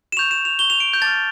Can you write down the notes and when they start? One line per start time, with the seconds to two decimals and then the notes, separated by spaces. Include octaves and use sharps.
0.12 E7
0.17 C#6 G6 F7
0.31 E7
0.45 F7
0.59 C#6 G6 G7
0.70 F7
0.80 D7
0.93 G6
1.02 A5 D6 F6 A6